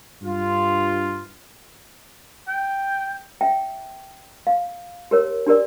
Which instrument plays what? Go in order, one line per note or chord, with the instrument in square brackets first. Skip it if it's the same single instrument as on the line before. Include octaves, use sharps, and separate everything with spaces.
[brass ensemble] G2 F4
[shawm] G5
[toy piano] E5 G5
F5
G4 A#4 C#5
D4 G4 A#4 D5